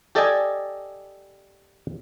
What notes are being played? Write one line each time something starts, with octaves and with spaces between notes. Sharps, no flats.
G4 A4 D5 D#5 G5 G#5